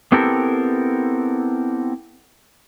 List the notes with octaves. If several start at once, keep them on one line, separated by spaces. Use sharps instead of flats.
B3 C4 E4 G4 A4 A#4